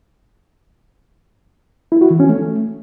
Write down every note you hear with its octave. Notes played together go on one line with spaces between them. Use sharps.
E4
F#4
E3
C#4
A3